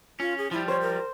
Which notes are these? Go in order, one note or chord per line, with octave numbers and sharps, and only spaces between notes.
C#4 F4
G#4
F3 G3 E4
C5 C#5
A#4